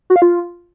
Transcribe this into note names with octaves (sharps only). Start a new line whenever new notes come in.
F#4
F5
F4